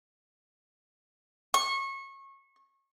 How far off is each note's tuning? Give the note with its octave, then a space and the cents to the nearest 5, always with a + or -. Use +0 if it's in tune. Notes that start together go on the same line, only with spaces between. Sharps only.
C#6 -25